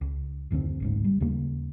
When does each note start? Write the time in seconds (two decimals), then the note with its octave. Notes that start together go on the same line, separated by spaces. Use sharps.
0.01 C#2
0.51 F#1 D#2 D3 C4
0.80 G#1 C#2 G#2
1.04 G3
1.20 D#2 C#3 A#3